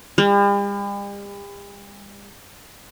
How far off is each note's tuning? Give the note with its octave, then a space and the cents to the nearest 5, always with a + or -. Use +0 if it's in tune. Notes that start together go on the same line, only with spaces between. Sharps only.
G3 +45